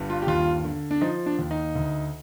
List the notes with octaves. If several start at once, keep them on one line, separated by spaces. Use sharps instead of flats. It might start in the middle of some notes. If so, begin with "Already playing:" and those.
Already playing: G1 G2
F4
G4
D#2 F4
D3
D4
F3 D#4
D4
D#2
D#4
D2